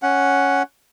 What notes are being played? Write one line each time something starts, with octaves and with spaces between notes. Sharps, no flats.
C#4 F#5